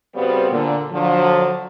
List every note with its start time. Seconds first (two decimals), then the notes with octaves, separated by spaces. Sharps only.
0.15 C#3 G3 B3 C4 F#4 C5
0.51 A#2 D3
0.91 D3 F3 F#3